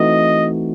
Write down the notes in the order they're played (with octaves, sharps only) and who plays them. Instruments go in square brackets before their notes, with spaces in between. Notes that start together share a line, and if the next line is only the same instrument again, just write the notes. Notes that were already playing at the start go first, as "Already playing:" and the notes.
Already playing: [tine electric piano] E3 A3 C4 D#4 F#4 [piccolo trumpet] D#5